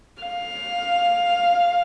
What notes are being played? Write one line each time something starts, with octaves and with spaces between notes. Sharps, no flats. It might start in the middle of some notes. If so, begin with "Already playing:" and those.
F5